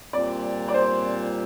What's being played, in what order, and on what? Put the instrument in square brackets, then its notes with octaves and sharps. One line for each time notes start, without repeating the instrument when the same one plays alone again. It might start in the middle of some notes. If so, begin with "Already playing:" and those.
[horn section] A#2 G3 C4 [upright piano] D5
[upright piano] D5
C5